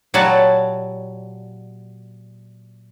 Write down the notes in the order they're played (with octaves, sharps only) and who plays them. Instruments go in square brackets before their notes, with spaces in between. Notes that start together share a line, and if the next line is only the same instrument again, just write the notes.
[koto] A#2 F#3 G3 F#4 C#5 A5